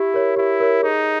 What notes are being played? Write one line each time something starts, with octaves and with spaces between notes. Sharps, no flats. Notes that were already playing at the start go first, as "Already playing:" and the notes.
Already playing: E4 G4
A#4 C#5
E4 G4
A#4 C#5
D#4 G#4